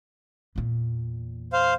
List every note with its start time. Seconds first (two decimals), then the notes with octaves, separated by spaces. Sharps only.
0.56 E2 A#2
1.53 C5 F5